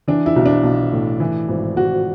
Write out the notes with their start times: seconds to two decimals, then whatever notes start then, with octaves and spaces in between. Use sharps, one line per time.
0.08 E3 D4
0.26 E4
0.36 B1
0.46 D4
0.64 B1
0.93 A2
1.20 E3
1.49 G#1
1.76 G#1 F#4